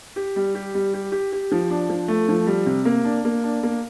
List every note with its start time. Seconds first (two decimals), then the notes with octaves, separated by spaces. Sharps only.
0.16 G4
0.36 G3
0.55 G4
0.74 G3
0.94 G4
1.12 G4
1.32 G4
1.52 F3
1.70 D4
1.90 F3
2.08 A3
2.29 F3
2.47 G3
2.66 C3
2.85 A#3
3.04 D4
3.25 A#3
3.44 D4
3.63 A#3